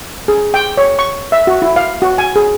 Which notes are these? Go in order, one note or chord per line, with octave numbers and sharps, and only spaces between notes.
G#4
G5
C#5
C#6
E5
F#4
E4
F5
F#4
G#5
G#4